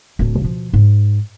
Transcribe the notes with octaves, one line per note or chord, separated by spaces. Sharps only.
D1 D4
B2 F3
G#2